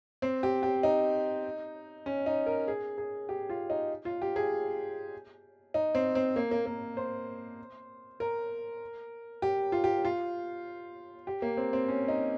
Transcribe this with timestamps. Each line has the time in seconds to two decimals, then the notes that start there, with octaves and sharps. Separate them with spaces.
0.22 C4
0.43 G4
0.63 G4
0.83 D#4
2.06 C#4
2.26 D#4
2.46 A#4
2.68 G#4
2.98 G#4
3.29 G4
3.49 F4
3.70 D#4
4.05 F4
4.22 G4
4.36 G#4
5.74 D#4
5.95 C4
6.15 C4
6.36 A#3
6.51 A#3
6.66 A#3
6.97 C5
8.20 A#4
9.42 G4
9.72 F4
9.84 G4
10.05 F4
11.27 G4
11.42 A#3
11.57 C4
11.73 C4
11.88 C#4
12.08 D#4